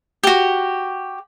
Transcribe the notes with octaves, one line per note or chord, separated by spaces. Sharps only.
F#4 G4